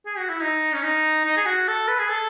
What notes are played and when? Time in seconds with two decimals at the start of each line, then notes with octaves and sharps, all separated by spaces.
0.06 G#4
0.18 F#4
0.29 E4
0.41 D#4
0.74 C#4
0.83 D#4
1.25 D#4
1.37 G#4
1.46 F#4
1.68 A4
1.88 B4
1.99 G#4
2.10 A4